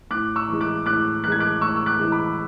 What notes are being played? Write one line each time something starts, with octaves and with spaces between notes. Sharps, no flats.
A2 D6 F#6
C#6 E6
E3 G#3
D6 F#6
A2 D6 F#6
E3 G#3 F#6 G#6
D6 F#6
A2 C#6 E6
E6
D6 F#6
E3 G#3
B5 D6